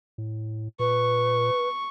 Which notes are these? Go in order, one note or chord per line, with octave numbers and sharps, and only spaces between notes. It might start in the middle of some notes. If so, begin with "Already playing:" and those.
A2
A#2 B4 C#6